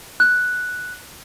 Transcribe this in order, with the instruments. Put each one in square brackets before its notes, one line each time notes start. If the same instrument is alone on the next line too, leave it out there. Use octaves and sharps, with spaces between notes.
[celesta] F#6